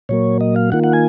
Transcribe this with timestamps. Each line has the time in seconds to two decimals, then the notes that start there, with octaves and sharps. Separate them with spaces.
0.09 A#2 F#3 A#3 C#5
0.41 D#5
0.56 F5
0.72 D#3 A#3 F4 F#5
0.84 F#5
0.93 G#5